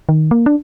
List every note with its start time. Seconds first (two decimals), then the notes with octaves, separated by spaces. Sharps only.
0.09 D#3
0.31 A#3
0.46 D4